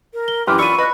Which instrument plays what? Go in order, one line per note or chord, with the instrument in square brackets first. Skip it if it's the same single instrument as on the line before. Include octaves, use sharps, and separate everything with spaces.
[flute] A#4
[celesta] G7
[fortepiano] F#2 E3 [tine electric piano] G4 B4 [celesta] C6 F6 [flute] D6
[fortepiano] D4 F4 [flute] B5 [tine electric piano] C#6 [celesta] E6 D#7
[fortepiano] B4 [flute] D#5 [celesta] B5 F#6